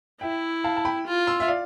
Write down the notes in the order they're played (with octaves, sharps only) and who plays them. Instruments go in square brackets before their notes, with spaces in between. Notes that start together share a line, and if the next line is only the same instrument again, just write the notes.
[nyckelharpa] E4 [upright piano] E5 G5
[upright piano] F5 A5
A5
G5 B5
[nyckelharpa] F4
[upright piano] C6 E6
E5
D5 F5